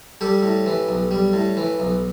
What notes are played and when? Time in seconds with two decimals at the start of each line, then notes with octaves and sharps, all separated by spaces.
0.21 G3 G4 A4
0.43 A2
0.66 E3
0.89 B1
1.11 G3
1.33 A2
1.57 E3
1.80 B1